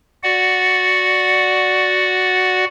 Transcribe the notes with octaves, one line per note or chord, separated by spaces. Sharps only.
F#4 D5 F#5